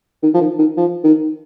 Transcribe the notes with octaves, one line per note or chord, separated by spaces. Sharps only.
D#3
F3
D#3
D#3
F3
D#3